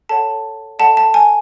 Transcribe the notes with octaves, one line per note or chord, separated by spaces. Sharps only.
A4 C#5 F#5 A5
A4 D5 F#5 A5
A5
G#5